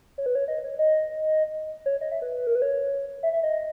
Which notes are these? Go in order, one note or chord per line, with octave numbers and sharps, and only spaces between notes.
C#5
B4
C#5
D#5
C#5
D#5
C#5
D#5
E5
B4
A#4
B4
C#5
E5
E5
D#5